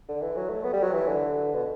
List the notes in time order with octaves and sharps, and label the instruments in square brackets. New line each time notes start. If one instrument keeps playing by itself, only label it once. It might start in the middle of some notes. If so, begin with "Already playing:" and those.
[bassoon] D3
E3
F#3
A3
B3
G3
F#3
E3
D3
B2